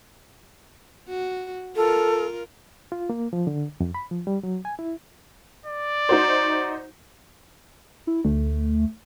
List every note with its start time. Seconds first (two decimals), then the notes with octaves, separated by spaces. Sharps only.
1.09 F#4
1.76 F4 A4 A#4
2.92 F4
3.10 A#3
3.33 F3
3.47 D3
3.80 F2
3.95 B5
4.11 F3
4.27 G3
4.43 F#3
4.65 G#5
4.79 E4
5.66 D5
6.09 D#4 F#4 C5
8.07 E4
8.25 D2 A3